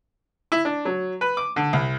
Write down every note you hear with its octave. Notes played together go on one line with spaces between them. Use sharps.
E4
D4
F#3
B4
D6
D3
C2